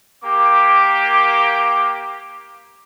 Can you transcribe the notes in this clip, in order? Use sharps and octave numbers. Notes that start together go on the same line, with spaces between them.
A#3 G4 D6